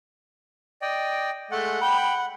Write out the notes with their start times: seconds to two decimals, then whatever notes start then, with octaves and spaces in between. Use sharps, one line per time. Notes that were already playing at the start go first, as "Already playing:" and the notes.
0.82 D5 D#5 G5
1.51 G#3 A3 F#5
1.81 G5 B5